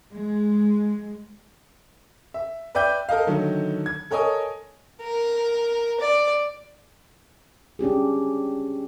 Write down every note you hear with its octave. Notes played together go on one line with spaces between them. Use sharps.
G#3
E5
B4 D5 E5 G5 G6
A4 A#4 D#5 F5
D3 D#3 F#3 A3 D#4
G#6
A4 A#4 C#5 D#5 G#5 D#6
A#4
D5
C#4 D4 G4 G#4